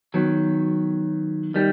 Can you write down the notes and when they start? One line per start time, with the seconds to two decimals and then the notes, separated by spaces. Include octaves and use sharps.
0.14 D#3 F#3 B3
1.54 D#3 G3